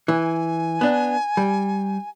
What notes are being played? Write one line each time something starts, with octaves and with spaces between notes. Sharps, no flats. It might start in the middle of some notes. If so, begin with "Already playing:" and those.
E3 G#5
B3 D4
G3